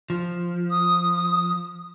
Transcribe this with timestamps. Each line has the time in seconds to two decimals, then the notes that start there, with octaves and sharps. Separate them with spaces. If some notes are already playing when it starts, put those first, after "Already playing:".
0.10 F3
0.70 D#6